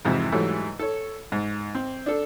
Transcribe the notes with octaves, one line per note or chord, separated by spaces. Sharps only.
F2 G#2 C3 E3 E4
G#2 E3 F#3 G3 A3
A4 C#5
G#2
C4
D4 A4